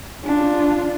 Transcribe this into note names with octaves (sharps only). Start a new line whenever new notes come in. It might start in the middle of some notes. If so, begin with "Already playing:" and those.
D4 F4